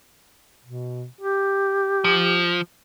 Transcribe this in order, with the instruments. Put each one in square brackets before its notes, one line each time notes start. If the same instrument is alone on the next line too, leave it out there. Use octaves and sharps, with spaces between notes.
[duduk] B2
G4
[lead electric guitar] F3